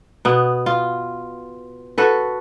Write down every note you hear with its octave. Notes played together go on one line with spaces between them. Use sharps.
B2 B3
F4
F#4 A4 B4